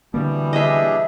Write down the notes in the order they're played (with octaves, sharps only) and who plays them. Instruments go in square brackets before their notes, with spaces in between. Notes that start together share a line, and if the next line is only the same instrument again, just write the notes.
[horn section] B2 E3 G3 [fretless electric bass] D3 A#3
[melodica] D4 G#4 [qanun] D#5 E5